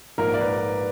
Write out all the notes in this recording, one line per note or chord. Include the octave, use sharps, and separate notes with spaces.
A#1 G#2 F3 A#3 A#4
D5
B4